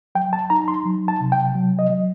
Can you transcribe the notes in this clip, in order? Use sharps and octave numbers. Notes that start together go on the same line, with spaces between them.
F#3 G5
A5
D#4 A#5
C6
F#3
A5
C3
G5
F#3
D#5
F#3